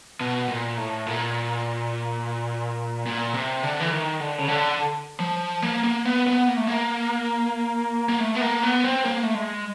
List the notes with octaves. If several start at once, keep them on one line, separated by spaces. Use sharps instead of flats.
B2
A#2
A2
A#2
A#2
C3
D3
E3
D#3
D3
C#3
D3
F3
A#3
A#3
B3
B3
A#3
A3
A#3
A#3
A3
B3
A#3
B3
C4
A#3
A3
G#3